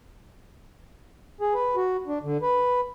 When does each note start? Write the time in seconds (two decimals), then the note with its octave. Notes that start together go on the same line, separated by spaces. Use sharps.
1.41 G#4
1.54 B4
1.76 F#4
2.07 D4
2.23 D3
2.42 B4